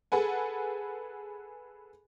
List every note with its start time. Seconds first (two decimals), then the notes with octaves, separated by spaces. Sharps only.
0.12 G#4 A4 B4 F#5 G#5